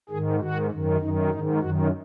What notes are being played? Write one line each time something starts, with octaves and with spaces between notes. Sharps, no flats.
G#2 D#3 G#4
G#2 D#3 F#4
F#2 D#3
F#2 D#3 D#4
G#2 D#3 D#4
F#2 D#3 F#4